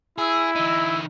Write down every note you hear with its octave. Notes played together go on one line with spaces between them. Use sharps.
E4 G#4 E6
E3 D#4